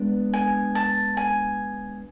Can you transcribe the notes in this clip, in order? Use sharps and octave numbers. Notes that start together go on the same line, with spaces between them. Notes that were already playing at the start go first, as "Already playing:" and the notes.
Already playing: G#3 B3 D4
G#5
A5
G#5